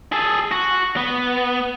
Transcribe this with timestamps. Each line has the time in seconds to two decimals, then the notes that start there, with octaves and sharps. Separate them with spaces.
0.12 G#4 A4
0.51 F#4
0.97 B3